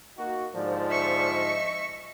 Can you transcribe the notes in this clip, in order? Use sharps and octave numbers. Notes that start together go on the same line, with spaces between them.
A#3 D#4 F#4
G#2 D3 F3 D5
E5 C#6
D#5